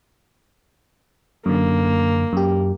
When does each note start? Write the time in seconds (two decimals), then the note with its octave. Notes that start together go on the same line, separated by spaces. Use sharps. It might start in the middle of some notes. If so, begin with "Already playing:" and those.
1.46 F#2 D3 A#3
2.33 F#2 G4